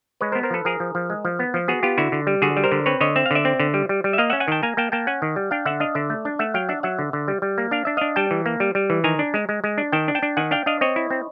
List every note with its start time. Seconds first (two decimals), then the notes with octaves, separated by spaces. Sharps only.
0.21 G#3 B4 C#5
0.32 A#4 C5
0.35 B3
0.43 A#4 C5
0.51 F3 A4 B4
0.65 F3 G#4 A#4
0.80 F3
0.95 F3
1.10 G#3
1.25 F3
1.39 B3
1.54 F3
1.68 B3 F#4 G#4
1.83 B3 F4 G4
1.98 D3 E4 F#4
2.12 D3
2.27 G3
2.42 D3 F#4 G#4
2.57 G3
2.64 A#4 C5
2.72 D3
2.86 C4 B4 C#5
3.01 D3 C#5 D#5
3.16 C4 E5
3.26 F5
3.31 D3 D5 E5
3.45 C4
3.60 D3
3.74 G3
3.89 G3
4.04 G3
4.13 E5
4.18 A#3 D#5 F5
4.30 C#4 E5 F#5
4.40 F#5 G#5
4.48 D#3 G5 A5
4.63 A#3 G#5 A#5
4.77 A#3 G5 A5
4.92 A#3 G5 A5
5.07 C#4 F#5 G#5
5.22 D#3
5.36 G3
5.51 D4 F5 G5
5.65 D3 E5 F#5
5.80 D4 D#5 F5
5.95 D3 D5 E5
6.10 A3
6.25 D4
6.39 A3 E5 F#5
6.54 F#3 F5 G5
6.69 D4 E5 F#5
6.83 F#3 E5 F#5
6.99 D3
7.13 D3
7.28 G3
7.42 G3
7.58 A#3
7.71 D4 F5
7.85 D4 E5
7.97 D4 D#5 F5
8.16 G3 G5 A5
8.31 E3
8.46 A#3
8.60 G3
8.75 G3
8.90 E3
9.04 D#3 G#5 A#5
9.19 D4
9.34 G#3
9.49 G#3
9.64 G#3
9.78 D4
9.92 D#3 G5 A5
10.08 D4
10.15 G5 A5
10.23 D4
10.37 D#3 F#5 G#5
10.51 D4 F5 G5
10.66 D4 D#5 F5
10.81 C4 C#5 D#5
10.96 E4
11.10 C4